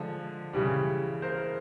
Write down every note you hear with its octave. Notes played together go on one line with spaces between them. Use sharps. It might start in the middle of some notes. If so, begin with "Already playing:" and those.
Already playing: D3 F3 G#3
C#3 E3 G3
A#4 C5